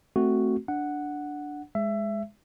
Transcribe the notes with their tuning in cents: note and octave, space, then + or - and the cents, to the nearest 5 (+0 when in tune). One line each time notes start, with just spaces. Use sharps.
A3 +0 C4 +0 F#4 +0
D4 +0 F#5 +0
G#3 +0 E5 +20